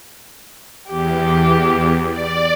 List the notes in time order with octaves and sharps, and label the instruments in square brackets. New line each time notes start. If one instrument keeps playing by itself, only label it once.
[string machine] E2 [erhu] G4
[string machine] D5